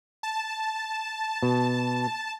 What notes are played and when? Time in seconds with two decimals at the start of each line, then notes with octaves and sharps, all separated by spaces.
0.23 A5
1.43 B2